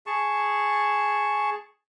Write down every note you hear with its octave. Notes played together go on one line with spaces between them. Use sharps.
G#4 A5 C#6